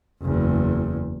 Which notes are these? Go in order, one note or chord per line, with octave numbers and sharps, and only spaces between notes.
F#1 E2